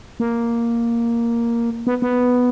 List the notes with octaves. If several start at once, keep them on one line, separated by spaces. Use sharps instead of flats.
A#3
B3
B3